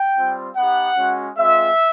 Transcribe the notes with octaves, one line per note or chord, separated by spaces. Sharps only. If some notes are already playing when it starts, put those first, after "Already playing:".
Already playing: G5
G3 C4 F4
B3 D#4 G4 F#5
G#3 C#4 F#4
G#3 C4 F4 E5